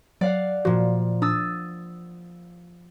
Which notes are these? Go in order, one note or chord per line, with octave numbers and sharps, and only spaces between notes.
F#3 D5 F5 F#5
A#2 F3 F#4
D4 D#6 E6 A6